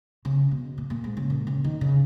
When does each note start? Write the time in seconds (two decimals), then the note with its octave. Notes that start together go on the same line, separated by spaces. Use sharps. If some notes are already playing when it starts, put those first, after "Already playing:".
0.25 C#3
0.51 B2
0.78 A#2
0.90 A#2
1.04 G#2
1.17 C#3
1.30 A#2
1.47 C#3
1.64 D#3
1.81 C#3